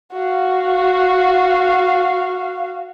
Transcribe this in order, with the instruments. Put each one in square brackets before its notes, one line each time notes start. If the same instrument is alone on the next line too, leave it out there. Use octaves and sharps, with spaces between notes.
[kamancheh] F#4 F5